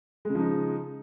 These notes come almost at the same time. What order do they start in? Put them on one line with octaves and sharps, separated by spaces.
G#3 C#3 F3 D#4